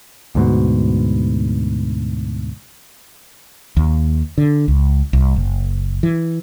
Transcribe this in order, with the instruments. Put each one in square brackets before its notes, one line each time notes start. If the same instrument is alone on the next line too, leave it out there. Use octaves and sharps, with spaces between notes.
[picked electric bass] D2 G#2 B2
[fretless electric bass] D#2
D3
C#2
C2
F#1
E3